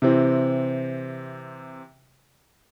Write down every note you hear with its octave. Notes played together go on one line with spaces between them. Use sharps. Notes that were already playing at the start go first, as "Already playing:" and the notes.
C3 E3 C4